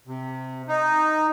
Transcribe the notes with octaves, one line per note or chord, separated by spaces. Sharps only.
C3
D#4